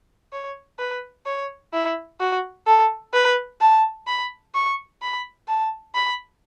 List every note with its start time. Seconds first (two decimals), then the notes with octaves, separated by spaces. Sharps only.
0.32 C#5
0.79 B4
1.26 C#5
1.73 E4
2.20 F#4
2.67 A4
3.14 B4
3.61 A5
4.07 B5
4.55 C#6
5.02 B5
5.48 A5
5.95 B5